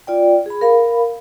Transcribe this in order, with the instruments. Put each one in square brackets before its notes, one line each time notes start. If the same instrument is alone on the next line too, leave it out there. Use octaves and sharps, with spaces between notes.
[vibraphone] F4 D5 G5
G#4 B5
A#4 F5 B5